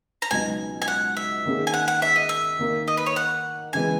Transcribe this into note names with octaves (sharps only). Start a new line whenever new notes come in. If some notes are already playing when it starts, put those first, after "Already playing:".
A#5
C#2 B2 F#3 B3 D#4 G#5
G#5
F#5
E5
D#3 A#3 C#4 G#4
G#5
F#5
F#5
E5
D#5
E5
D#3 A#3 D#4 A#4
D#5
B4
C#5
F#5
C#3 E3 G#3 B3 G#5